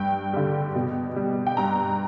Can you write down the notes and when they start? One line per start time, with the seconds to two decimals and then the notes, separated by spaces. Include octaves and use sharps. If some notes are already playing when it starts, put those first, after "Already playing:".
Already playing: G2 G5
0.33 D3 G3
0.75 B2
1.16 G3
1.47 G5
1.57 G2 A#5